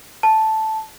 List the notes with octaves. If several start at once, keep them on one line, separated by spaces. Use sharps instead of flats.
A5